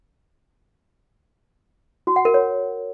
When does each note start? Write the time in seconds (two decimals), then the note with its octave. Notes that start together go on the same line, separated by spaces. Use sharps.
2.07 F#4
2.16 F#5
2.25 A#4
2.34 C#5